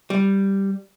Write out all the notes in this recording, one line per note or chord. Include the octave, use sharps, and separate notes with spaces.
G3